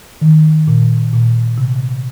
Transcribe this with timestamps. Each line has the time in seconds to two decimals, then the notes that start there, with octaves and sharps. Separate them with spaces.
0.21 D#3
0.68 A#2
1.13 A#2
1.58 C3